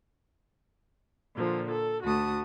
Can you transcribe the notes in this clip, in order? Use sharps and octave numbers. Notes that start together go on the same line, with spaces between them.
A#2 D3 F3
A4
D2 A3 F#4 A5 D#6